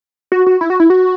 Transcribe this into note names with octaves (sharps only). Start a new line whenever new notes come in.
F#4
F#4
E4
F#4
E4
F#4